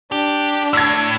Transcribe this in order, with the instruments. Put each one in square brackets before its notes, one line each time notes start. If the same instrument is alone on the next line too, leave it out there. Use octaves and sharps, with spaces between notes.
[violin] D4 [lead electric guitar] G4
[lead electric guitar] A2 [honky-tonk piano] E6 G#6